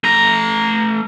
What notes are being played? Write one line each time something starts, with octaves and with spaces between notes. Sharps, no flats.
A3 A#5